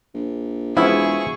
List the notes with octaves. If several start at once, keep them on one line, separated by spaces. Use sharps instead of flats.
A#1
E1 F3 B3 E4 G#4 E5 C#6